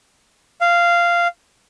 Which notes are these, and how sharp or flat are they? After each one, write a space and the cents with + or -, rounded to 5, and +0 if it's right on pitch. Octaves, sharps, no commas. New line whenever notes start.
F5 -10